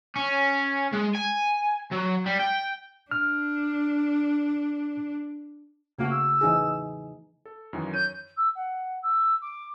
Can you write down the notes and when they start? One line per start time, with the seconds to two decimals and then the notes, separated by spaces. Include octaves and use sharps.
0.16 C#4
0.93 G#3
1.15 G#5
1.92 F#3
2.26 G3
2.39 G5
3.11 D4 F6
5.99 C#3 A3 A#3 F#4
6.11 E6
6.41 E3 D#4 G#4
7.45 A4
7.73 F#2 D#3 E3
7.94 C#5 G6 D#7
8.37 E6
8.55 F#5
9.02 E6
9.41 D6